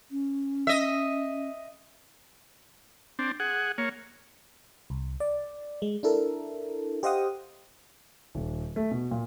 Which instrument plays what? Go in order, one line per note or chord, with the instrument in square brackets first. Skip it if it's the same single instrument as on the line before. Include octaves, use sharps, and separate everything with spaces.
[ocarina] C#4
[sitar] D#5 E5
[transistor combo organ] C4 D4
G#4 F#5
A#3 C#5
[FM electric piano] C2
D5
G#3
D4 E4 A4 A#4
G4 C5 D#5 F5 F#5 D#6
[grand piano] D#1
A3
B2
A#2